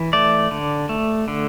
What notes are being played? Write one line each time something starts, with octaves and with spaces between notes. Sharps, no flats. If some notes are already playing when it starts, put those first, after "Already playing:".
Already playing: E3
A3 D5
D3
A3
D3